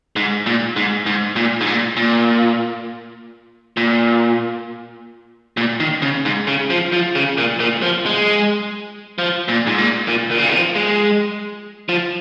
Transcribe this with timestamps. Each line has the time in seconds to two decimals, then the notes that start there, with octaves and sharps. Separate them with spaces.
0.16 G#2
0.46 A#2
0.76 G#2
1.06 G#2
1.36 A#2
1.61 G#2
1.66 A#2
1.97 A#2
3.77 A#2
5.57 A#2
5.80 D#3
6.02 C#3
6.25 G#2
6.47 C#3
6.70 F3
6.92 F3
7.15 C#3
7.38 A#2
7.60 A#2
7.82 F3
8.06 G#3
9.18 F3
9.48 A#2
9.67 G#2
9.78 A#2
10.08 A#2
10.31 A#2
10.38 C#3
10.46 A#2
10.53 F3
10.76 G#3
11.89 F3